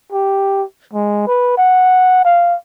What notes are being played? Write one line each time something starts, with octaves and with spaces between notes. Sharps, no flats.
G4
G#3
B4
F#5
F5